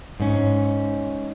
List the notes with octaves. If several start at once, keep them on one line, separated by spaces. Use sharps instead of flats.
G#2 C#4